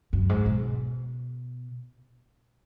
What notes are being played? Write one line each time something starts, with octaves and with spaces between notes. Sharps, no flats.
F#2
G#2
B2